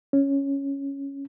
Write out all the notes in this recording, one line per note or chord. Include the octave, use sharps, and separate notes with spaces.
C#4